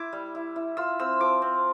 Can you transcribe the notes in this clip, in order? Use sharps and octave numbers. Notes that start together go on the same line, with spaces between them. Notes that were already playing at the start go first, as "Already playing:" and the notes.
Already playing: E4 D6
G3
E4
E4
F4 E6
C4 E6
F3 D6
C4